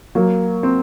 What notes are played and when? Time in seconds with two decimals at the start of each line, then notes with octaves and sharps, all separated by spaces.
0.15 F#3 A#3
0.63 C4